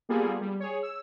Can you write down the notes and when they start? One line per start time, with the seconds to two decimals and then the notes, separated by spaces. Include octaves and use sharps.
0.09 G3 A#3 B3 F4 G#4 A4
0.41 G3
0.60 G#4 C#5
0.83 E6